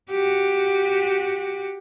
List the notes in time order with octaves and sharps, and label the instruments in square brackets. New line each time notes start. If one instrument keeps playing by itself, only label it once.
[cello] F#4 G4